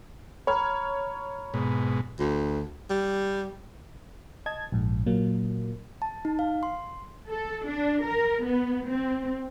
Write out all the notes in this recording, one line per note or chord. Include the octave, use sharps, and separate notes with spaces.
C#5 A#5 B5 F6
G#2 B2
D2
G3
D#5 A5 G#6
A#1 G#2
A#2 F#3 A#3
A5
D#4
F5
C6
A4
D4
A#4
B3
C4